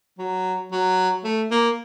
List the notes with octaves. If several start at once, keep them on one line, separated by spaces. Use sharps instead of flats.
F#3
F#3
A3
A#3